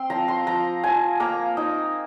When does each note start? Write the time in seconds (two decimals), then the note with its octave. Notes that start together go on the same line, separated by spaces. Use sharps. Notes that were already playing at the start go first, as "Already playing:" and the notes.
Already playing: C4 C6
0.10 F3 A#5
0.28 C6
0.47 F3 A#5
0.83 F3 G#5
1.20 A#3 A#5
1.57 D#4